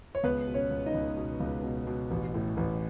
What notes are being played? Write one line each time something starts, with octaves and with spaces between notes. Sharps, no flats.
C#5
C#2 B3 B4
B2
C#4 C#5
C#2
D#4 D#5
C#2
B2
C#2
B2
B2
A1
A2
A1